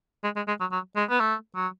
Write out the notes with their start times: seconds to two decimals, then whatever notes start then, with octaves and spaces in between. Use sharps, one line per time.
0.24 G#3
0.36 G#3
0.48 G#3
0.61 F#3
0.72 F#3
0.96 G#3
1.10 B3
1.20 A3
1.55 F#3